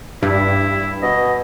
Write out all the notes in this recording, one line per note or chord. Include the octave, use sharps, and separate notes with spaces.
G2 E4
B2 D#5